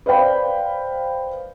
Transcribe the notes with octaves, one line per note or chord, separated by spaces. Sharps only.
B4 C5 D5 F5 G5 B5